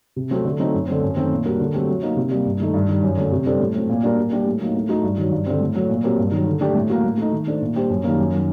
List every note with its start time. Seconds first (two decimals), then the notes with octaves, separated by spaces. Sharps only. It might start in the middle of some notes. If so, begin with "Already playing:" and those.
0.16 C3
0.31 F#3 A3 C4 F#4
0.45 D3
0.59 F#3 A3 C4 D#4
0.74 F#2
0.87 D3 A3 C4
1.03 F#2
1.16 D#3 A3 C4
1.32 A#2
1.45 G3 D4 F#4 A#4
1.60 D3
1.74 F#3 A3 C4 G4
1.88 F#3
2.03 A#3 D#4
2.16 C3
2.31 G3 A#3
2.45 G2
2.60 D#3 A3 D#4
2.74 G2
2.88 D#3 G3
3.03 F#2
3.17 D3 F#3 A3
3.32 C3
3.46 G3 D4 A4 C5
3.60 A2
3.75 F#3 A3 C4
3.89 A#2
4.03 G3 D4 F#4 A#4
4.18 A#2
4.32 G3 D4 G4
4.46 A2
4.61 F#3 A#3 D#4
4.75 A2
4.89 A3 D#4 F#4
5.03 G2
5.18 D#3 F#3
5.32 G2
5.46 D3 G3 C4
5.61 A2
5.75 F#3 A3
5.89 A#2
6.04 F#3 C4 G4 A#4
6.18 G2
6.32 D#3 F#3
6.46 D3
6.61 A3 D4 G4
6.75 A2
6.90 F#3 A#3 F#4
7.04 A2
7.18 A3 D#4
7.32 D#3
7.47 A3 D4 A4 C5
7.62 A#2
7.76 G3 D4 G4 C5
7.90 F#2
8.04 D#3 G3 A#3
8.18 F#2
8.32 D#3 F#3